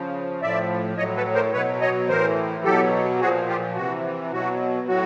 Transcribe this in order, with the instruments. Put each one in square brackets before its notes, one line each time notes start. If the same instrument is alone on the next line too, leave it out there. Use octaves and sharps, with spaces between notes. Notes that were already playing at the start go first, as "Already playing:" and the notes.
Already playing: [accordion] C#3 F3
A2 F3 D5 E5
A2 F#3 C#5 D#5
A4 B4
A#4 C5
B2 F#3 B4 C#5
C#5 D#5
A2 E3 A#4 C5
B2 F#3 G4 A4
A#2 F3 F#4 G#4
F4 G4
C3 E3 F#4
B2 F#3 F#4
A2 F#3 F#4